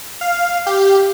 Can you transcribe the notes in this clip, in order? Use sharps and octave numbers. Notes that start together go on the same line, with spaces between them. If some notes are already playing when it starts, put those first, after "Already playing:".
F5
G4